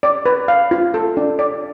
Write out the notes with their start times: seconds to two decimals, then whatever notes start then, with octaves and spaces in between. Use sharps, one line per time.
0.03 D5
0.26 B4
0.48 F5
0.71 F4
0.94 A4
1.17 D4
1.39 D5